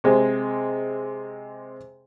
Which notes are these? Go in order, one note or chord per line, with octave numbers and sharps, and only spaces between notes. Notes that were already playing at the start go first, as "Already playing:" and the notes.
C3 G#3